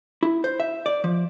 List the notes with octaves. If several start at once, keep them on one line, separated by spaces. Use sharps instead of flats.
E4
C5
E5
D5
F3